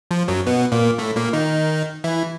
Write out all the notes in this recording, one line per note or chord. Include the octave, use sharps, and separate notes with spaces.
F3
F#2 F#3
B2 B3
A#2 A#3
A2 A3
A#2 A#3
D#3 D#4
E3 E4